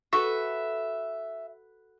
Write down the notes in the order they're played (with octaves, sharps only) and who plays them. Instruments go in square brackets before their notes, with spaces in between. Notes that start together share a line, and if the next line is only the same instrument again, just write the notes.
[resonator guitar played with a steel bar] F#4 A4 B4 [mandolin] E5 [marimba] C#6